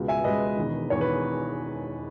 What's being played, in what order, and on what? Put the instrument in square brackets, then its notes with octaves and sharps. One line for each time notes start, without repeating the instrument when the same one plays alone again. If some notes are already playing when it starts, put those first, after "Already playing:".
Already playing: [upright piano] C#2 B2 G#3
E5 G#5
C#2 B2 G#3 B4 D#5
E1 E2 D#3
E1 E2 D#3 C#5
B4